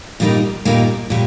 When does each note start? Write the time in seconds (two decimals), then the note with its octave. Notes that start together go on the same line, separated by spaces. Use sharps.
0.20 A#2 G3 A#3 D#4
0.65 A#2 G3 A#3 D#4
1.10 A#2 G3